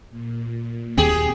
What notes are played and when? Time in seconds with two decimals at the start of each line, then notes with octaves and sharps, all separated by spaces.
0.10 A#2
0.97 D#2 D#3 C4 G4 G#4